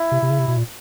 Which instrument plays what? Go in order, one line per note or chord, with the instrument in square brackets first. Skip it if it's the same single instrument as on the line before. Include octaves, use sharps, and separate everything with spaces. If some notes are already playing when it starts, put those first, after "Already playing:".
Already playing: [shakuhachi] E4
[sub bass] C3
C3
C#3
C3
B2
A#2